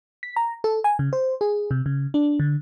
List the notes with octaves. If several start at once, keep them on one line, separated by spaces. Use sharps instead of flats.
B6
A#5
A4
G#5
C#3
C5
G#4
C3
C#3
D4
D3